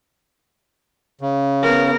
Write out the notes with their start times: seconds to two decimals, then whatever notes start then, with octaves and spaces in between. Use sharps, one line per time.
1.21 C#3
1.63 B3 A#4